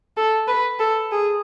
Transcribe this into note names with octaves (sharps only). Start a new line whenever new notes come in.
A4
B4
A4
G#4